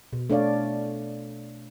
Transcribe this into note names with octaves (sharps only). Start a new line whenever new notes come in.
B2
A3 D4 A4 C#5 D5 F5